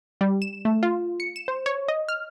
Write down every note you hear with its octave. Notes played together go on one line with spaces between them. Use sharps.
G3
E7
A3
F4
C#7
E7
C5
C#5
D#5
F6